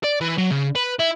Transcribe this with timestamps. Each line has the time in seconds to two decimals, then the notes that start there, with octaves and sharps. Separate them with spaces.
0.04 D5
0.21 E3
0.38 F#3
0.51 C#3
0.76 B4
0.99 E4